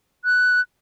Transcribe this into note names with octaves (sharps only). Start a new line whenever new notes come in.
F#6